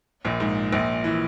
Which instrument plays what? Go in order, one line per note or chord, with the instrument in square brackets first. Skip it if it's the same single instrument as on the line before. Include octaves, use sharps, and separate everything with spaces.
[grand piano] A#1 A#2
G#2
A#1 A#2
E3